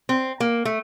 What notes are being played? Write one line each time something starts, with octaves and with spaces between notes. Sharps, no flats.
C4
A#3
A3